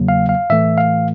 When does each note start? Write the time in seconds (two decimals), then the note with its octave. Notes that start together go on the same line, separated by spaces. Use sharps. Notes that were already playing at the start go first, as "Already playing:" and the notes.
Already playing: E2 C#3 F#3 A#3
0.08 F5
0.29 F5
0.50 A2 E3 A3 E5
0.78 F5